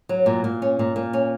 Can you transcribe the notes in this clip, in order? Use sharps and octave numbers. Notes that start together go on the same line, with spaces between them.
F#3
A#2
A#2
C#4
A#2
A#2
C#4